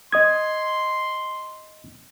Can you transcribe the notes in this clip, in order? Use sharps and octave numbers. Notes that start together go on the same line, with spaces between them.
D#5 C6 D#6 G#6